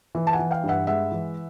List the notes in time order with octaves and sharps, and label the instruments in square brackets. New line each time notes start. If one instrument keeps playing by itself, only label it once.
[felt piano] E3
A5
F#5 G#5
E3
F5 G5
G2
E5 F#5
G#3 E5 F#5
E3